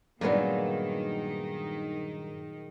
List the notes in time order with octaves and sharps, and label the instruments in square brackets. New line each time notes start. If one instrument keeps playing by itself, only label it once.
[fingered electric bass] G2 [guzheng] A#2 F#3 G#3 [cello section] D#3 D#4 [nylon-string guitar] A#3 B3